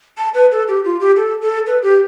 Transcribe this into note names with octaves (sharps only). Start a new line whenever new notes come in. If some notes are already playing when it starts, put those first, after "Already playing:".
A5
B4
A4
G4
F4
G4
A4
A4
B4
G4